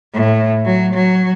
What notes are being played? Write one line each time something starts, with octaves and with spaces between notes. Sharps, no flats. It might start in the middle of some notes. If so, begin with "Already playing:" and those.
A2
F#3
F#3